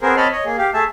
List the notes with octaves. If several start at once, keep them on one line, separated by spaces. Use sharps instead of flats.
B3 C4 G#4 A#4 C5
C4 C#5 D#5 A5 B5 F6
C#5 D#5
A#3 G#4
G4 F5
A3 G#4 E5 A5